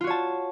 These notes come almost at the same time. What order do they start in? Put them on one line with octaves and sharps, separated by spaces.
F4 F#4 C#5 A5